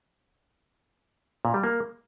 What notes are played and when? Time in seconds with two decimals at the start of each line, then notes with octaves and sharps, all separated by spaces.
1.45 A#2
1.54 G3
1.64 A#3